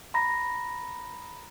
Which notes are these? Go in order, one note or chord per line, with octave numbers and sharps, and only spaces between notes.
A#5 B5 A#6